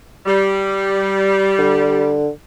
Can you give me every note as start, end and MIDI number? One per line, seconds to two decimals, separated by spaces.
0.26 2.17 55
1.59 2.30 50